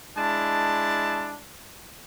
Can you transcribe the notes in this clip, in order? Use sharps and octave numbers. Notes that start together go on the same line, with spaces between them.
G#3 D4 E4 A5